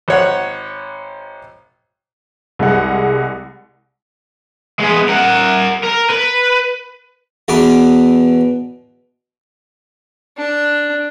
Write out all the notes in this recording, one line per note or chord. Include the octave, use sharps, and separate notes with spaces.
G#1 C#5 F#5
C2 G#3 F#5
G#3 B3
A#4 F#5
A#4
B4
E2 B2 B3 D6
D4